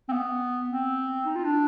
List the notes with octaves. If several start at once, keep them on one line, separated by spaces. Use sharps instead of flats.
C4
B3
C4
D#4
F4
D4